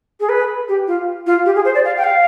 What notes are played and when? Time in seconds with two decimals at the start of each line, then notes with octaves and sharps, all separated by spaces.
0.20 G#4
0.29 B4
0.69 G4
0.88 F4
1.27 F4
1.46 G4
1.55 G#4
1.65 C5
1.75 D5
1.85 F5
1.97 G5
2.04 F5